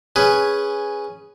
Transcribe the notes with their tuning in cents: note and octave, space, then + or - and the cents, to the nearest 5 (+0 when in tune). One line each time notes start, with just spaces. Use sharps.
C#4 +0 G#4 +0 B4 +0